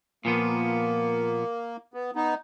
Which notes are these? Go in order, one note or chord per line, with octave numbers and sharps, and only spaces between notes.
A#2 F3 A#3 B3
B3
B3 D#4